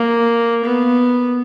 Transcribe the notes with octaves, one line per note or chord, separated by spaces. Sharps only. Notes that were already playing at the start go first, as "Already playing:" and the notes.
Already playing: A#3
B3